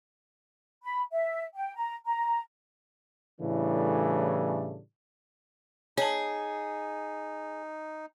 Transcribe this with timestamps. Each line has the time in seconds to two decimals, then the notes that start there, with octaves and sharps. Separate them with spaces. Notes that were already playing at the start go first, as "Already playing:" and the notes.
0.83 B5
1.12 E5
1.55 G5
1.76 A#5
2.05 A#5
3.41 A2 C#3 E3 G3 A3 D4
5.97 D#4 G#4 C#5 A5